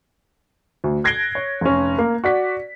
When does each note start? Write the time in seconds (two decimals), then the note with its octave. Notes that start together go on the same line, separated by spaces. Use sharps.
0.84 D2
1.04 F#6 G#6 A#6 C7 D7 G7
1.35 C#5
1.61 F1 C#4
1.98 A#3
2.24 F#4 D5 B6